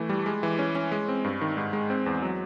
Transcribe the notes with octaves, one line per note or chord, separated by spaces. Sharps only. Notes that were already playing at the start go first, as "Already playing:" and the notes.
Already playing: E3 A3
G3
G#3
E3
C#4
C#4
G#3
C4
G2
D#3
G#2
G#3
C4
E2
F#3